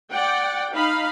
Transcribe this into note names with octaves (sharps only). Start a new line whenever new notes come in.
D5 F#5 G5
D#4 F5 B5